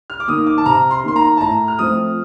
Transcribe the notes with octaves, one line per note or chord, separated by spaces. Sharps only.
F6
D6
D#3 A#3 D#6
D6
A5
C3 A#5
C6
D#3 A#3 C6
A#5
A5
A2 A#5
F6
F3 A3 C4 D#6